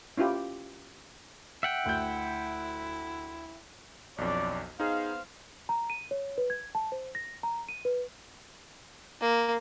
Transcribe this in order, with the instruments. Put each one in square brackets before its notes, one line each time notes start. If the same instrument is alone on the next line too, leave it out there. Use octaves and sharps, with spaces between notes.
[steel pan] C#4 E4 F4 G4
[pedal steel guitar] E5 F#5 G5
[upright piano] D2 G6 [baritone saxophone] E4
[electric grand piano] B1 F2 [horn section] D4 C#5 D5
[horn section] B3 C5 F5 [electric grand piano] D#4 G#4
[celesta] A#5
D#7
C#5
B4
G#6
A5
C5
A#6
A#5
D#7
B4
[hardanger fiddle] A#3